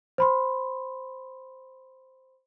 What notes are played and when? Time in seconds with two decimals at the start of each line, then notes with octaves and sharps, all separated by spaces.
0.18 C5 B5 C6